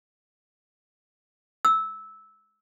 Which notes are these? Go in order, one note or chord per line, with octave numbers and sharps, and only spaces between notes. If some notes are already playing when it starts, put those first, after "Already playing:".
E6